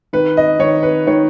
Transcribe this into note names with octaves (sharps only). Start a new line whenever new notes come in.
D#3 B4
D#5
D#3 C#5
B4
D#3 C#5